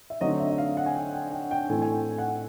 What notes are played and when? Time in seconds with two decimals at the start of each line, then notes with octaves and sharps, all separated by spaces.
0.10 E5
0.21 D3 F#3 A3 C4 D#4 D#5
0.40 E5
0.51 E5
0.58 F5
0.77 F#5
0.86 G#5
0.95 G5
1.13 G5
1.32 G5
1.51 G5
1.69 A2 E3 A3 C4 G#5
1.82 G#5
1.94 G5
2.18 F#5